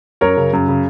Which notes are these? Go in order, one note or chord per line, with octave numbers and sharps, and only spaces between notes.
F#2 A#4 C#5
C#3
F#2
C#3